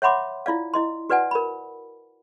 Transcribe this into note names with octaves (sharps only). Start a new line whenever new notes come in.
C#5 E5 F#5 B5 C6 D6
E4 F4 D5 F5
E4 D#5 C6
F#4 B4 D5 F#5 G#5
A#4 B5